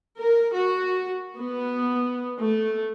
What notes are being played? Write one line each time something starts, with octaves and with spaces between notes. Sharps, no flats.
A#4
F#4
B3
A3